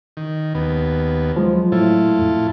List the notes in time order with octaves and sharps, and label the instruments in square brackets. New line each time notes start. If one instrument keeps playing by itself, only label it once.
[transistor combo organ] D#3
D#2 B3
[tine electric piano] F3 [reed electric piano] F#3 G#3
[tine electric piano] A2 [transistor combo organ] E4 F4 A4
[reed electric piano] F2